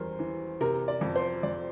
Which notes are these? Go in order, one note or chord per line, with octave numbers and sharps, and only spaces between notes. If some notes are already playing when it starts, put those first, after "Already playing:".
Already playing: E2 G3 A#4 C5
E3
C3 A#4
D5
F2
C5
F2 D5